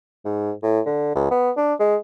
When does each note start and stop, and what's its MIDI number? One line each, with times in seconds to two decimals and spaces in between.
0.25 0.53 44
0.63 0.80 45
0.86 1.15 50
1.16 1.30 37
1.31 1.51 59
1.57 1.74 62
1.80 1.96 56